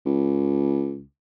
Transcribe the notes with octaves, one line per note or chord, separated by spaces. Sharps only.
C#2